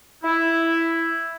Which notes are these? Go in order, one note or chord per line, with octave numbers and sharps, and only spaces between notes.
E4